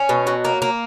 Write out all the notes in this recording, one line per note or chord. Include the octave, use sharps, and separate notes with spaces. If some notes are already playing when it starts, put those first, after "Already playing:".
Already playing: C#4
B2
F#3
A#3
A#3